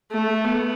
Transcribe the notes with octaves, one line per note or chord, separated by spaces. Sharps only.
A3
B3